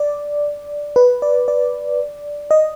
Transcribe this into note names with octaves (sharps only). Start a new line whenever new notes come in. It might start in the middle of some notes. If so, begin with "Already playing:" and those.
Already playing: D5
B4
D5
D5
D#5